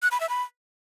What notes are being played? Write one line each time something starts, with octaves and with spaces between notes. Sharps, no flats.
F#6
B5
E5
B5